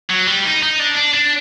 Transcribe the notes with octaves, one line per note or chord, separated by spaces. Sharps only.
F#3
G3
D#4
D#4
D4
D4
D4